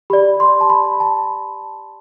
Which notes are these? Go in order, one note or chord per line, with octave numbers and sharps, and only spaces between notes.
G4 D5 B5
C6
A5
B5
A5